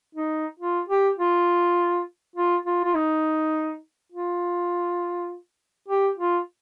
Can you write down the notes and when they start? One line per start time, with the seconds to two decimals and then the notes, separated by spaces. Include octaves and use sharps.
0.15 D#4
0.59 F4
0.88 G4
1.19 F4
2.36 F4
2.66 F4
2.84 F4
2.94 D#4
4.12 F4
5.88 G4
6.18 F4